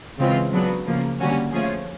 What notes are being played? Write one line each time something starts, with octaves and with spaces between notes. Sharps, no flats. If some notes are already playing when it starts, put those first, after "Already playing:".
C#3 E3 G#3 C4 F4
C#3 F#3 B3 D4
C#3 F3 A#3
D3 G3 A#3 C#4 F#4
F3 A3 C#4 F4 G#4